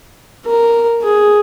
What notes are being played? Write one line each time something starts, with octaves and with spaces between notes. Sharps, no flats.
A#4
G#4